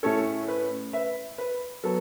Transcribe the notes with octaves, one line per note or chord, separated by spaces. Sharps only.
A2 A3 C#4 A4 C#5
B4
B4 E5
B4
F#3 B3 A4